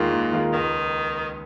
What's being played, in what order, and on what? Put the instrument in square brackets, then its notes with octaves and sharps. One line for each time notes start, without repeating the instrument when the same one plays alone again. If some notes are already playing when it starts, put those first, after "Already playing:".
Already playing: [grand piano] D#2 D#3 G#3 F4 A#4 [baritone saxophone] A#2
[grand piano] D#2
D#3 G#3 F4 A#4
[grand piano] C#2 [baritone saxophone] D#3